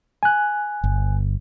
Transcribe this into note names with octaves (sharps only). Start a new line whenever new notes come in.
G#5 F#6
G1